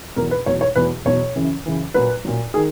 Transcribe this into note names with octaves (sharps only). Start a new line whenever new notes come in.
E2 B2 F#3 A#4
B4
E2 B2 F#3 C#5
C#5
E2 B2 F#3 B4
E2 B2 F#3 C#5
F#2 C#3 E3
F#2 C#3 E3
A#2 F#3 B4
A#2 F#3
D#3 G#4